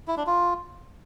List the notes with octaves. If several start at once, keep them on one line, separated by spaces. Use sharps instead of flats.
E4
D4
F4